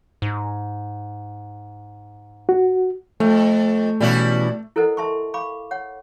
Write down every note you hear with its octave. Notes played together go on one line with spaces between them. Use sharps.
G#2
F#4
F2 A3
B2 E3 G3 C#4 E4 F#4
E4 A4 A#4 C5 D#5 F#5
E5 A5 C6 C#6
F5 B5 C#6 D6
C#5 F#5